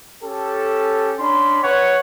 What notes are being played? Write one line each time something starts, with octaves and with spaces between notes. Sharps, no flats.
C#4 G4 A4
C#4 D4 B5 C6
B4 C#5 F#5 C#6